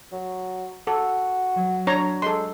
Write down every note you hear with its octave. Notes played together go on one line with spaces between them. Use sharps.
F#3
F#4 A4
F#3
D4 C#5 A#5
G#3 A4 C6